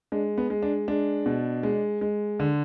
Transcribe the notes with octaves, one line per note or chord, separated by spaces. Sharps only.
G#3 D4
B3
G#3
D4
G#3 D4
B2
G#3
G#3
D3